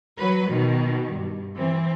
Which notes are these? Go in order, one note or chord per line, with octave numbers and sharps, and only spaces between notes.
F#3 B4
B2 D#3
G2
E3 C4